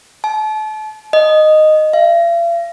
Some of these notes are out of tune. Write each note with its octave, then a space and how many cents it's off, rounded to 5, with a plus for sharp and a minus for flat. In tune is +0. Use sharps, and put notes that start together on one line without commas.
A5 -35
D#5 -10
F5 -45